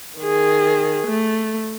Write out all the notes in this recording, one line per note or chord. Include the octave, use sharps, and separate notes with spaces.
D#3 G#4
A3